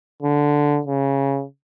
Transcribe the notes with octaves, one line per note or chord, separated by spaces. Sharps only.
D3
C#3